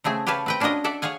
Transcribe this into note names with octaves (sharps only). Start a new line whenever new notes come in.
C#3 A3 C4 G#4
G4 B4 C#5 F5 A5
C4 B4 G5
C#4 D4 F4 F#4 A#4 D#5
A4 D5 E5 F#5
G#4 C#5 F5 F#5 G#5